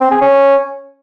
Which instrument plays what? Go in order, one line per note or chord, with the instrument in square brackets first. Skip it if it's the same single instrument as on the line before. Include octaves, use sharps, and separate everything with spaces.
[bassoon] C4
G#4
C#4